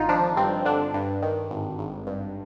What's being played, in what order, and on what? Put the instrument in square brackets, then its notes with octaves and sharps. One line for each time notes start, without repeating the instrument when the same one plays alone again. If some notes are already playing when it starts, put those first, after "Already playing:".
Already playing: [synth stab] G#1 D3 D#4 F4
F3 D4
G2 C4
D3 D4
G2
D#3
G#1
G#1
G2